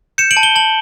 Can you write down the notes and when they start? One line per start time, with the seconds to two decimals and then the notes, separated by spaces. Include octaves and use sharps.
0.18 G6 C#7 E7
0.31 D7 F#7
0.37 A5
0.43 G7
0.55 A5 F#7